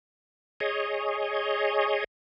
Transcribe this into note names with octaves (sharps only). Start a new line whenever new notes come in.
G#4 C#5 D#5